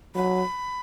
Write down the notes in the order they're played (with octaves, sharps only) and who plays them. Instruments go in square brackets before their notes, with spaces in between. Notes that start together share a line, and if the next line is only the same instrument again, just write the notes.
[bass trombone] F#3 [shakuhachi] B5